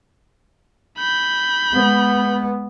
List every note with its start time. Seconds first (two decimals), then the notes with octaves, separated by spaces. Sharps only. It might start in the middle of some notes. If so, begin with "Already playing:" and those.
0.98 B5 G6
1.73 G#3 B3